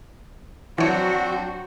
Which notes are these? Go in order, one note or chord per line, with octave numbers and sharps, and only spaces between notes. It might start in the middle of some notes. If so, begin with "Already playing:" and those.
E3 F#3 C4 D4 F#4 C5 C#5